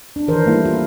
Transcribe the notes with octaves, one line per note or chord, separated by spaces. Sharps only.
D4
D#3 E3 A#4 C5
G3 A3 A#3 E4
F4